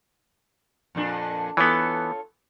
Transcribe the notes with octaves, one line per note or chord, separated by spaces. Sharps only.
F2 A#2 D4
E3 B3 F4 A4 C#5